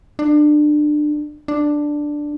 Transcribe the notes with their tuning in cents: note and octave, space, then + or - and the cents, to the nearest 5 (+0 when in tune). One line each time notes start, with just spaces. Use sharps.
D4 +25
D4 +5